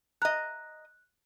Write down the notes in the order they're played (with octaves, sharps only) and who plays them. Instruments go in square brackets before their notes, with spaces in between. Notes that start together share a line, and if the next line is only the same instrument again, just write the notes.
[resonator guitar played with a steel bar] D#5 A#5 [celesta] F#6